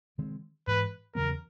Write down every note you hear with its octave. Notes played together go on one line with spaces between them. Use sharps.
C3 D#3 G#3 C4
G#2 E3 G#3 B4
E2 C#3 F#3 B3 A#4